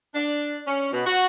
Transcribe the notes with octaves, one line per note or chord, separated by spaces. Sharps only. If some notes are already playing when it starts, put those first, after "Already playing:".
D4
C#4
B2
F#4